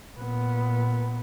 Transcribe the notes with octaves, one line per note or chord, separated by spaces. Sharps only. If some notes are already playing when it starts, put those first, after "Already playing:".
A#2 B3